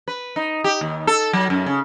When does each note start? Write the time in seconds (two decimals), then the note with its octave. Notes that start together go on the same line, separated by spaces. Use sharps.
0.08 B4
0.36 D#4
0.64 G4
0.81 D#2
1.07 A4
1.33 F#3
1.50 F#2
1.66 C#3